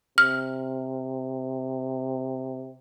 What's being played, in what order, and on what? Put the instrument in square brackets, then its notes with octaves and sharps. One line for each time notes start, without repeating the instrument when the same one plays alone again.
[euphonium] C3 [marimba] F6